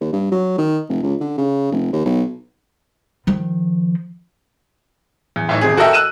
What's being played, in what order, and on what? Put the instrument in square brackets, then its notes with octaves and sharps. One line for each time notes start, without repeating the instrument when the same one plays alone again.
[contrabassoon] D#2
G2
F#3
D#3
F1
C#2
D3
C#3
F1
D#2
B1
[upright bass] D#3 F3
[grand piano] E2
A2 E3 D#4
D#1 C3 G#4
F#4 A4 A#4 D#5 E5 G5
E6 F#6 D#7 E7